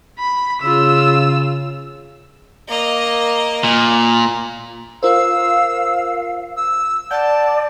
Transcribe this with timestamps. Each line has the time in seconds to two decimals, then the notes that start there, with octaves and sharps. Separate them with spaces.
0.19 B5
0.62 C#3 F4 E6
2.68 A#3 D#5
3.64 A#2
5.03 F4 A#4 C5 F5 E6
6.56 E6
7.11 D5 F#5 A5 G6